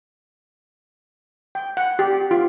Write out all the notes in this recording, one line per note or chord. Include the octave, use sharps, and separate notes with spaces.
G5
F#5
G4
F4